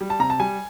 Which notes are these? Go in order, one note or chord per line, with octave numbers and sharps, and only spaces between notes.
G3
A5
C3 A#5
A5
G3 G#5